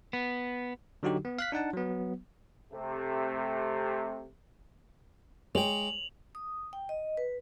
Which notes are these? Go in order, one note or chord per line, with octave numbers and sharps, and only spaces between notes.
B3
D3 F#3 D#4 F#4 G4
B3
F5 F#6 B6
D4 D#4 F#5 A5
F#3 B3
C3 A3
G#3 C#5 G5 F7 F#7
D#6
G5
D#5
B4